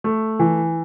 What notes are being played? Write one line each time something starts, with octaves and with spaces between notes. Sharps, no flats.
A3
E3